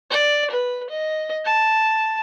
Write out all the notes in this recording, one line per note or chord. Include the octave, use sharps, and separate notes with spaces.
D5
B4
D#5
A5